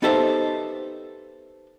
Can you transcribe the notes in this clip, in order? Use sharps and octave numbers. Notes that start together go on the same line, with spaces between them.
B3 D#4 G4 A4 C5 E5